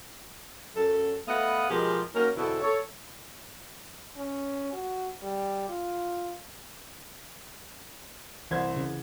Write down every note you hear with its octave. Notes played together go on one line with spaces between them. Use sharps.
F#2 A4
A3 B3 B4 D#5 F5 F#5
B2 F3 G#3 G4 G#4 A#4
F#3 A#3 C#4 D#4 A#4
E2 B2 D3 C4 E4 A4
A4 C#5
C#4
F#4
G3
F4
C2 E3 C5 G#6
C#3